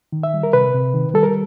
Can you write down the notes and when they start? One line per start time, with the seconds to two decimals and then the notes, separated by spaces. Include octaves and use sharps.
0.12 D#3
0.23 E5
0.34 G3
0.43 A#4
0.53 C3 B4
0.74 C3
0.94 D#3
1.14 G3 A4
1.23 A#4